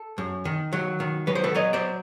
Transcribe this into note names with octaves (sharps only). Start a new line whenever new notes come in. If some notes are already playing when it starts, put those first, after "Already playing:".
Already playing: A4
F#2
D#3
F#3
D#3
F#3 B4
C5
A4 B4
F#3 C#5 D#5
C5 D5